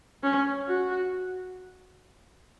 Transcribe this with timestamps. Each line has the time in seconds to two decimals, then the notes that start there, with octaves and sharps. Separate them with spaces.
0.23 C#4
0.68 F#4